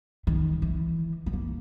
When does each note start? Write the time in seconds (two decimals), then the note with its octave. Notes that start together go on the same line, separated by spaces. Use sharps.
0.27 D#3
0.62 E3
1.26 B3
1.33 A#3